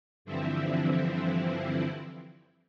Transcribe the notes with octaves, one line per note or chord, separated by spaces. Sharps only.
G2 D3 E3 F3 C4 E4